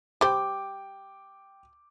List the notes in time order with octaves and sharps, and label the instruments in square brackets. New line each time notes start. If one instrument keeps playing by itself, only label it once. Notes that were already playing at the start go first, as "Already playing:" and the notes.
[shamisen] G3 C5 [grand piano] G5 D6